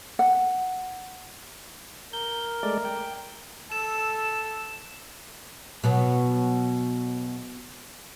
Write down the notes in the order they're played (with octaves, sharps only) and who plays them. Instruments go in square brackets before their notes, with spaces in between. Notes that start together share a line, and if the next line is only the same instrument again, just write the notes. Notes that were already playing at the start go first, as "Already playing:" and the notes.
[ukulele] F#5
[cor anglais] A#4 [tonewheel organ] G6
[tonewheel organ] G#3 A3 D5
G5
[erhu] A4 [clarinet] E6 [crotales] E7
[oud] B2 F#3 B3